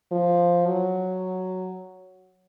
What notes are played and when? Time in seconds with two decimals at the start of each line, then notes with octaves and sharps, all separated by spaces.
0.12 F3
0.67 F#3